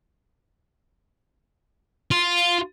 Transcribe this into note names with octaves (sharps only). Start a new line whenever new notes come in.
F4